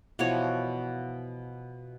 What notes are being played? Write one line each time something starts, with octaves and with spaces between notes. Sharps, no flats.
B2 E3 F3 C#5